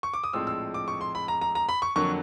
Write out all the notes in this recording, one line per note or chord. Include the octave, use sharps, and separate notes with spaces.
C#6
D6
D#6
A#1 A2 F3 G#3 C4 E6
E6
D6
C#6
C6
B5
A#5
A#5
A#5
B5
C#6
F2 D3 F#3 A#3 C#6